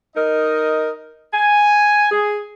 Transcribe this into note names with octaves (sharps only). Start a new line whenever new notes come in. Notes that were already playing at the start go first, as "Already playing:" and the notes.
D#4 A#4 D#5
G#5
G#4